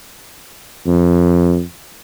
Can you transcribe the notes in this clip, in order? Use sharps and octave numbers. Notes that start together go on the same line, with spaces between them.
F2